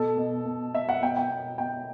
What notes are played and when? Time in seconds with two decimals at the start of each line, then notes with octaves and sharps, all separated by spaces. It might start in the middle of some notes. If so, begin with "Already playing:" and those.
Already playing: B2 A4
0.18 B2
0.45 B2
0.74 B2 E5
0.89 F#5
1.02 B2 G5
1.17 G5
1.31 B2
1.58 B2 G5